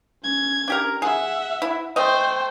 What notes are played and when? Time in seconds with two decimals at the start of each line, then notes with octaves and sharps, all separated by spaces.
0.23 C#4 G#6
0.68 D4 G4 A#4
1.02 G#4 E5 F#5
1.62 E4
1.96 A3 C5 D#5 G5